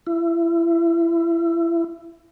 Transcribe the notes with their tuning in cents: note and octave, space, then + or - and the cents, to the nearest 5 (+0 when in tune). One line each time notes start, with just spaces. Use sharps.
E4 +30